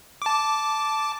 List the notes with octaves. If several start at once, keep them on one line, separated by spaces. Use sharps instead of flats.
A5 D6